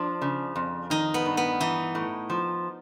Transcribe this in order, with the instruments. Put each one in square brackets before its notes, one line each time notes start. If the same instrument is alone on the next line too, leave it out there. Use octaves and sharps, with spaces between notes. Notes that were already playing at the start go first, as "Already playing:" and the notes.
Already playing: [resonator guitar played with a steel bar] F3 [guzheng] D4
[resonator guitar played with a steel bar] C#3
F2
[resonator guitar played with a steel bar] D#3 [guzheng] D#4
[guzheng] B3
[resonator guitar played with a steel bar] G2
[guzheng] B3
[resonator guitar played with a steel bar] E3 [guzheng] D#4
[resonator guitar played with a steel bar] A2
F3